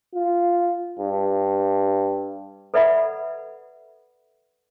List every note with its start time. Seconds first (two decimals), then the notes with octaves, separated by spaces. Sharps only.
0.14 F4
0.99 G2
2.74 A4 B4 D5 E5 F#5 B5